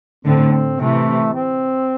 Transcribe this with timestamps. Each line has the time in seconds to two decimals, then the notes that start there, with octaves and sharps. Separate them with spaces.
0.25 A2 D3 C4
0.52 C4
0.80 C3 E3 A3
1.33 C4